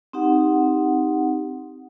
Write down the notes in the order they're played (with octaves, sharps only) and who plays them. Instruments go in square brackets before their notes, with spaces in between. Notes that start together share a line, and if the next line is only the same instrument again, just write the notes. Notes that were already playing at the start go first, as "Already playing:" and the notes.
[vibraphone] C4 D#4 G4 F#5